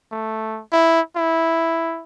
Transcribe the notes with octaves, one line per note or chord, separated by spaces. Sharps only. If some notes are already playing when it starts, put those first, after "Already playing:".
A3
E4
E4